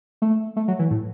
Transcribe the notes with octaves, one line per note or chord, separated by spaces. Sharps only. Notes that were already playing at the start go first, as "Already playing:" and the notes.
A3
A3
F#3
E3
A2